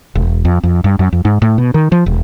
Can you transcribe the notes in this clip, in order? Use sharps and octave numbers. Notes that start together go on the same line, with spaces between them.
E1
F2
F2
G2
F#2
F2
G#2
A2
B2
D#3
F3
E1